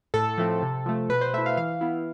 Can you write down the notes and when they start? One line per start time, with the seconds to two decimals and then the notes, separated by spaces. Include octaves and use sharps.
0.14 A2 A4
0.38 F3 A3 C4
0.62 C3
0.86 F3 A3
1.09 B2 B4
1.21 C5
1.34 A3 E4 E5
1.46 F5
1.57 E3 F5
1.81 B3 E4